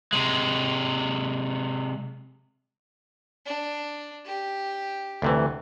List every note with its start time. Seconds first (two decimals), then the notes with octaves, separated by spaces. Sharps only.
0.13 C3 G#3
3.46 D4
4.26 G4
5.22 D2 C3 E3